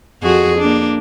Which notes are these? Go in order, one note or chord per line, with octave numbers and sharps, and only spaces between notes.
F2 F#4 G#4
A#3 D4